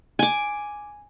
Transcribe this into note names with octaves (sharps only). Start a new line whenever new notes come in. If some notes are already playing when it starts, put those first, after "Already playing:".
G#5 D6